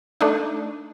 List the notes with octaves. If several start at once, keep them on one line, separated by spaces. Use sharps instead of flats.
A3 D4 D#4